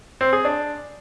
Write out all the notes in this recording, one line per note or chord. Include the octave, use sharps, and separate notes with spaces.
C4
G#4
D4